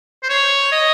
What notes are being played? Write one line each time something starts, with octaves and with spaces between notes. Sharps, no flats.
C5
C#5
D#5